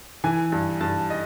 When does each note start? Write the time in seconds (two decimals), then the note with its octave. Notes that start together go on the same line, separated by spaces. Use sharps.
0.24 E3 G#5
0.52 G2
0.81 G2 A5
1.10 D#5